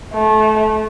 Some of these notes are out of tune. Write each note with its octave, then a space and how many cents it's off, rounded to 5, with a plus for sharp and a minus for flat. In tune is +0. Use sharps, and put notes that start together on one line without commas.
A3 -25